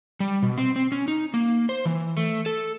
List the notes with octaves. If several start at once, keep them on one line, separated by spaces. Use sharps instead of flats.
G3
B2
C4
C4
C#4
D#4
A#3
C5
E3
A3
A4